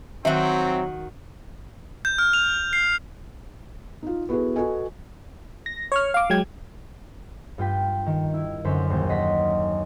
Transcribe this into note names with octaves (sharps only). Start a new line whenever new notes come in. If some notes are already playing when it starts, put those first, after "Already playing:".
D#3 F#3 C4 F#4 E5
G6
F6
F7
C7
D#4 F4
B3 E4 F#4 G#4 A4 B4
F#4 A4 B4 D#5 G#5
A#6
C#5 C#6 F6
F5 D6
F#3 G#3 G5 G#6
G2 F4 G5 B6
D#3
E4
F#2 D3 C5 B6
A#1 D#2 C5
D#5 F#5 C6 A#6 B6